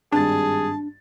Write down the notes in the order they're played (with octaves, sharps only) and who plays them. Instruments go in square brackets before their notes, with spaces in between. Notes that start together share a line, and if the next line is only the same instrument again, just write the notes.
[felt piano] G#1 G2 A6 [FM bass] D4 [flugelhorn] G#4 [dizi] A5